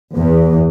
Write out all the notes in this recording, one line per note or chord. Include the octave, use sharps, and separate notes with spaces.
E2